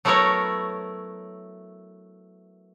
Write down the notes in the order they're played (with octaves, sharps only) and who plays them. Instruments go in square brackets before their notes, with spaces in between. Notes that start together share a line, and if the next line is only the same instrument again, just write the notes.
[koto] F#3 A3 B3 E4 A#4 C#5